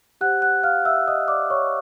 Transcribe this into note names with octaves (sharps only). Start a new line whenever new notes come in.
G4 C5 F#5 F#6
F#5 F#6
F5 F6
E5 E6
D#5 D#6
D5 D6
C#5 C#6